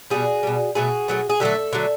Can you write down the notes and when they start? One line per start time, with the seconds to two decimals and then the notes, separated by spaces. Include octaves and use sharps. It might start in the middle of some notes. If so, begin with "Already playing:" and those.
0.10 B2 G3 F#4 G#4
0.43 B2 G3
0.75 B2 F#3 A3 F#4 G#4
1.08 B2 F#3 A3
1.29 G#4
1.40 D3 F#3 A3 G4 A4
1.73 D3 F#3 A3